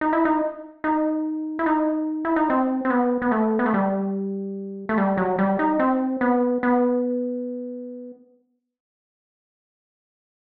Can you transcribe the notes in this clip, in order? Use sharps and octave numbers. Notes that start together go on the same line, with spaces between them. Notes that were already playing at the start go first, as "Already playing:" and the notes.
D#4
E4
D#4
D#4
E4
D#4
E4
D#4
C4
C4
B3
B3
A3
B3
A3
G3
A3
G3
F#3
G3
D#4
C4
B3
B3